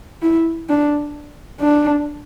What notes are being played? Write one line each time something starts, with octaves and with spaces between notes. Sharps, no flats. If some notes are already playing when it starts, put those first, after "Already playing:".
E4
D4
D4